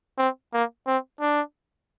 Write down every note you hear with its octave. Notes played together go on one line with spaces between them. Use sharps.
C4
A#3
C4
D4